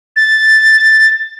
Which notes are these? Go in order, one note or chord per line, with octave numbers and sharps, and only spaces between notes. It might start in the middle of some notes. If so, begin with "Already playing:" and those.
A6